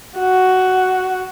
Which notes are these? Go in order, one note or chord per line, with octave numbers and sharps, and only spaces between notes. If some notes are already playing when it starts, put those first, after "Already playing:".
F#4